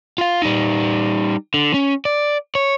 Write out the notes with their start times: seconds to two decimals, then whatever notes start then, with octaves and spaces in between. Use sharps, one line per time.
0.18 F4 F5
0.42 G3 D#4
1.54 D3
1.74 C#4
2.05 D5
2.55 C#5